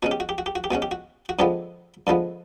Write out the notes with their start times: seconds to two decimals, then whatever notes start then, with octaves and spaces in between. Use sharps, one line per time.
0.03 B2 G#3 C#4 F#4
0.11 G4
0.20 F#4
0.29 G4
0.38 F#4
0.46 G4
0.55 F#4
0.64 G4
0.71 B2 G#3 C#4 F#4
0.82 G4
0.91 F#4
1.29 F#4
1.39 G2 D3 F3 G#3 B3 G4
2.07 G2 D3 F3 G#3 B3